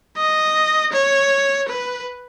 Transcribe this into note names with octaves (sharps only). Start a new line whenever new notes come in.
D#5
C#5
B4